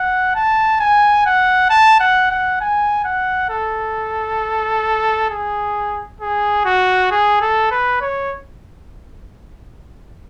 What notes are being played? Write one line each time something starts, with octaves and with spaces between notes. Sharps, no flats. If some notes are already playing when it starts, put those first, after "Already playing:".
Already playing: F#5
A5
G#5
F#5
A5
F#5
F#5
G#5
F#5
A4
G#4
G#4
F#4
G#4
A4
B4
C#5